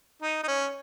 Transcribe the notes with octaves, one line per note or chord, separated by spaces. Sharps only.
D#4
D#4
C#4